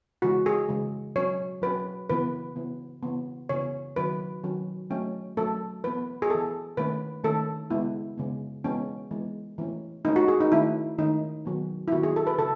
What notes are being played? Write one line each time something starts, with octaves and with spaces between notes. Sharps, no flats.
C#3 E3 G#3 F#4
G#4
C#3 E3 G#3
F#3 C#4 C#5
F#3 C#4 B4
C#3 E3 B3 B4
C#3 E3 B3
C#3 E3 B3
C#3 E3 B3 C#5
D#3 F#3 C#4 B4
D#3 F#3 C#4
F#3 A3 C#4
F#3 A3 C#4 A4
E3 B3 B4
G#4
E3 B3 A4
D#3 A3 C#4 B4
D#3 A3 C#4 A4
C#3 G#3 B3 E4
C#3 G#3 B3
E3 G#3 B3 C#4
E3 G#3 B3
E3 A3 C#4
E3 A3 C#4 D#4
F#4
G#4
D#4
D#3 A3 C#4 E4
D#3 A3 C#4 D#4
D#3 F#3 B3
E4
D#3 F#3 B3 F#4
G#4
A4
B4
C#3 A4